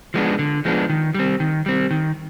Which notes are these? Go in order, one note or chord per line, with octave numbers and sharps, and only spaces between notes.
F3 G#3 B3 D4
D3
F3 G#3 B3 D4
D#3
G3 C4
D#3
G3 C4
D#3